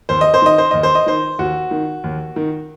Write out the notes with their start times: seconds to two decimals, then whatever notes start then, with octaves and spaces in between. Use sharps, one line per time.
0.09 D#2 C5
0.21 D#5
0.34 C5
0.42 D#3 D#5
0.58 C5
0.71 D#2 D#5
0.83 C5
0.95 D#5
1.06 D#3 C5
1.39 D#2 F#4
1.71 D#3
2.04 D#2
2.36 D#3